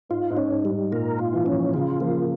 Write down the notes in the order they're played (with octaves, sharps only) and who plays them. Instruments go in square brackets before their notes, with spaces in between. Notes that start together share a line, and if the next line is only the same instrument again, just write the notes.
[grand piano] G#2 [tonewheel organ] F4
[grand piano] G#2
[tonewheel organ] C#4
[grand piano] G#2
[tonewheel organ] G3
[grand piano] G#2
[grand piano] A#2 [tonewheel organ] A#4
[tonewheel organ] F4
[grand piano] E3
[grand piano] F3 [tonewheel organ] C#4
[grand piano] E3
[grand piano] C#3 [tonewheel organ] F4
[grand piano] F3 [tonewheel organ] A#3